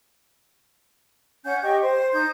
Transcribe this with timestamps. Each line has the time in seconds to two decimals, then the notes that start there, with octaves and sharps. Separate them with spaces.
1.45 C#4 F#5 G#5 G6
1.63 G4 D#5 C#6
1.82 C5
2.13 D#4 G6